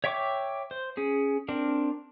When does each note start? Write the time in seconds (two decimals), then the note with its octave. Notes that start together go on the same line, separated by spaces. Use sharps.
0.04 C#5 E5 G5 C#6 D6
0.71 C5
0.97 C#4 G#4
1.48 C4 D4 A#4